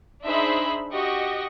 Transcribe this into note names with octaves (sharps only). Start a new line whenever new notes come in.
D4 D#4 G#4 C5 E5 B5
F#4 G4 D#5 C#6